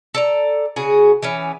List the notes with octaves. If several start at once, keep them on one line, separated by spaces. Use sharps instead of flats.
A4 D5 A#5
C#3 F#4 G#4
E3 B3 C#4